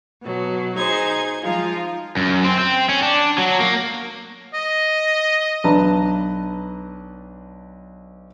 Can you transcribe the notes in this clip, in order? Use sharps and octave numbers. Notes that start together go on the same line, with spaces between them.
B2 F#3
D#4 G#4 C5 G#6
F3 G#3 D#4 F4
F#2
C4
C4
C#4
D4
F#3
A#3
D#5
B1 D4 B4 A5 A#5